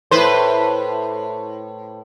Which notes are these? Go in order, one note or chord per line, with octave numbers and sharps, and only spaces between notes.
A2 B4 C5